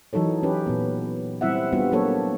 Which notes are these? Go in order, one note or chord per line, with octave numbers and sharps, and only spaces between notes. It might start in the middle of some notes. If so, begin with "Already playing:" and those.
E3 F#3 D#4 A4 C#5
C#4 G4 B4
A#2 B3
G3 C4 E4 E5 F#5
G3 B3 D4 F4 F#4
F#3 A#3 D4 A4 C#5